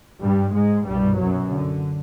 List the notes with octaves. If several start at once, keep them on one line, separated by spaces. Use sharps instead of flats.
G2 G3
G#2 G#3
C2 G2 B2 G3
F#2 F#3
D3